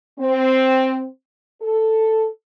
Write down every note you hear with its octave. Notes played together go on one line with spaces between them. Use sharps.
C4
A4